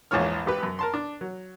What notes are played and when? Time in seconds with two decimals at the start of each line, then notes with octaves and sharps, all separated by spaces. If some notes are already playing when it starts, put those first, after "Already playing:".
0.11 A#1 E2 G#2 F4 C#5 F6
0.46 G#1 G4 B4
0.63 F#2
0.79 A#4 A5 C6
0.94 D4
1.21 F#3